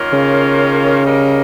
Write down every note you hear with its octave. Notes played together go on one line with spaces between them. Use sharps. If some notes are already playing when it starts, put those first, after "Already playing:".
Already playing: D#3 A#3 C#4 F4 A#4
C#3
G3 A#3 D#4 A#4